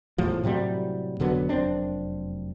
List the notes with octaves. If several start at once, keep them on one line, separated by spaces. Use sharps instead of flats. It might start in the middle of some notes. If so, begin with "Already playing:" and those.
E2 A2 F3
A2 C3 F#3 G3
F1 D3 F#3 B3
F1 F#2 C4 D4